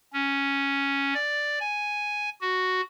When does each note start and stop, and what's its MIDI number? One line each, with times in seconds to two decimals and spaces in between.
0.13 1.14 61
1.14 1.59 74
1.60 2.29 80
2.41 2.81 66